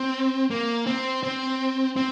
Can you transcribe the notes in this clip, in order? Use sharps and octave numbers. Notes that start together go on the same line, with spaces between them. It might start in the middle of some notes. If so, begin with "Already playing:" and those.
Already playing: C4
A#3
C4
C4
C4